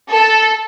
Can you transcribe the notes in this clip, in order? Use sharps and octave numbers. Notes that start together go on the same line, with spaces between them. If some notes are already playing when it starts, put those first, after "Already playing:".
A4